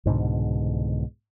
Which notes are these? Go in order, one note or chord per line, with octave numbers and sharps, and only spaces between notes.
C2 G#2 B2 D3